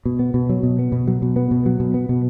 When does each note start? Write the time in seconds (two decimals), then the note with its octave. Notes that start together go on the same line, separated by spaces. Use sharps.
0.05 B2
0.19 B3
0.34 B2
0.49 F#3
0.63 B2
0.79 B3
0.92 B2
1.07 F#3
1.22 B2
1.36 B3
1.51 B2
1.66 F#3
1.80 B2
1.94 B3
2.09 B2